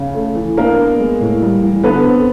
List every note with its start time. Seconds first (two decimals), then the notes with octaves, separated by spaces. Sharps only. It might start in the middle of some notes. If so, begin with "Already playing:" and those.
Already playing: C#3
0.15 A3
0.35 E3
0.57 A#3 D4 A#4
0.77 B3
1.00 G#3
1.21 A2
1.42 G3
1.62 E3
1.84 D3 B3 B4
2.04 C4